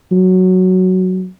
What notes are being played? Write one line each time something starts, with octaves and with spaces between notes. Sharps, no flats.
F#3